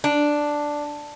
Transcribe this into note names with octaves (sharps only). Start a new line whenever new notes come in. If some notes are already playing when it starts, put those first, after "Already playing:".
D4